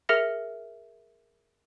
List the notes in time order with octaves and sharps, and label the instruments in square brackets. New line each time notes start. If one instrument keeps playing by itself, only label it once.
[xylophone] G#4 A#4 E5 F6 A#6 C#7